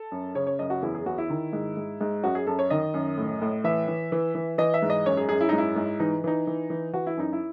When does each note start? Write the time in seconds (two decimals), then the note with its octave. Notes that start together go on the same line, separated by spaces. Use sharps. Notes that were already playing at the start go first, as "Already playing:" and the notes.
Already playing: A4
0.12 F#2
0.35 C#3 C#5
0.47 C#5
0.59 F#2 D#5
0.70 F#4
0.82 E2 E4
0.95 G#4
1.06 E2 F#4
1.18 E4
1.30 D#3
1.53 G#2
1.77 G#2
2.01 G#2
2.23 F#2 F#4
2.35 G#4
2.47 F#2 A4
2.59 C#5
2.70 D#3 D#5
2.94 F#2
3.18 A2
3.42 A2
3.64 E3 E5
3.88 E3
4.12 E3
4.35 E3
4.58 E3 D#5
4.74 E5
4.82 G#2
4.90 D#5
5.06 F#2 C#5
5.17 G#4
5.29 F#2 G#4
5.41 E4
5.49 D#4
5.53 G#2
5.58 E4
5.76 G#2
6.00 E3 D#4
6.24 E3 D#4
6.47 E3
6.70 E3
6.93 E3 F#4
7.07 E4
7.17 F#2 D#4
7.33 E4